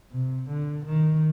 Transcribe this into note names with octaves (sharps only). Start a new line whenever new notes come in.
C3
D3
D#3